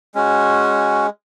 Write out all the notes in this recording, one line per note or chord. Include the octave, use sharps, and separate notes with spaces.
G#3 C#4 F#4